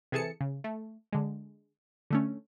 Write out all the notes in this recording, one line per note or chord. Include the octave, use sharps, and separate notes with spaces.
C3 E3 G#4 A4 A5 C#7
C#3
A3
D3 G#3
D3 A3 C#4